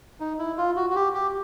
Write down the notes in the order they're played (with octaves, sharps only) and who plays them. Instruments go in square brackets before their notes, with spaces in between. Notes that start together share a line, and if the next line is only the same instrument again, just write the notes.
[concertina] D#4
E4
F4
F#4
F#4
G4
G4